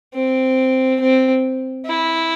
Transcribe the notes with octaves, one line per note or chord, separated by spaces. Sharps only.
C4
C4
E4